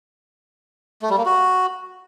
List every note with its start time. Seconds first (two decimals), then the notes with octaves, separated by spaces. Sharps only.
1.02 A3
1.10 G3
1.18 A#3
1.26 F#4